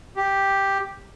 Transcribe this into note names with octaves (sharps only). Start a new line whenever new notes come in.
G4